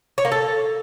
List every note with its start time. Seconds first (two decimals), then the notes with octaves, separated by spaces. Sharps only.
0.18 C#5
0.25 A#3
0.32 A4